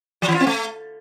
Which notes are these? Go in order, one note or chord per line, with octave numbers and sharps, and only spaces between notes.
F3
E3
F4
C4
A3